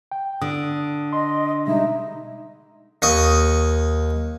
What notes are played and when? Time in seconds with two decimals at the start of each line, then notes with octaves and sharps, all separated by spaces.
0.12 G5
0.42 D3 D#6
1.13 D#5 C6
1.67 B2 G3 G#3 D#4 E5
3.02 D#2 D#5 C#6 D#6